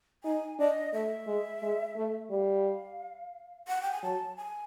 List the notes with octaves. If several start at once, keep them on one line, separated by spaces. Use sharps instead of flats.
D#4 G#5
D4 D#5
A3 E5
G#3
G#3
A3
G3 F5
F#5
G5
G#5
F#3 A5
G#5